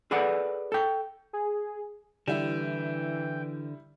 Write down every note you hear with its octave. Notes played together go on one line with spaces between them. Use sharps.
G#4 A4 B4 D5 F#5
A4 G5
G#4
D3 E3 G3 E4 G5